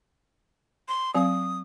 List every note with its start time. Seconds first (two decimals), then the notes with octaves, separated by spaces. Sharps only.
0.88 C6
1.15 F#3 C4 F5 D#6